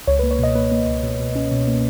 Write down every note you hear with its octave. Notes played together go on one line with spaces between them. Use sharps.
C#2 C#5
B4
A#3
C#5
B2 D#5
A#3 B4
A#3
C#2
B2
B2
C#4
B2
A#3